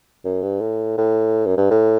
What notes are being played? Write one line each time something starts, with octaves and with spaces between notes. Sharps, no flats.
F#2
G2
A2
A2
F#2
G2
A2